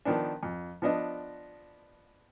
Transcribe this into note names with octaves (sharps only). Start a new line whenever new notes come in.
D#3 F3 B3 D4
F2
F3 B3 D4 D#5